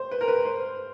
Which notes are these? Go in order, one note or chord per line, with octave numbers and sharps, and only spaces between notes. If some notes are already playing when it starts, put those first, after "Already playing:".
Already playing: C5
B4
A#4
B4
C5